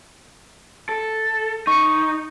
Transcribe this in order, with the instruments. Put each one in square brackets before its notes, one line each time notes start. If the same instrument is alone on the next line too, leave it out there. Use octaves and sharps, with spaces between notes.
[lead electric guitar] A4
[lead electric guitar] D#4 [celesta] C#6 C#7